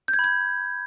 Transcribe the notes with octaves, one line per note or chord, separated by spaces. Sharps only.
G6
G#6
B5
G#6